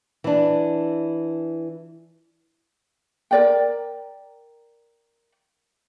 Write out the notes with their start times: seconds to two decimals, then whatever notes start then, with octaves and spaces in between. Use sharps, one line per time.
0.24 E3 D4
3.31 A#4 D5 G5